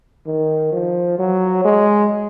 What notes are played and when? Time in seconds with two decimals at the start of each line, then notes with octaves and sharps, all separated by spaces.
0.27 D#3
0.72 F3
1.19 F#3
1.65 G#3